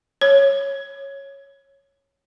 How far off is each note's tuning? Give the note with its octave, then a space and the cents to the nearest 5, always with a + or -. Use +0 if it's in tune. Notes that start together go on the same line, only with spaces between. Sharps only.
C#5 -10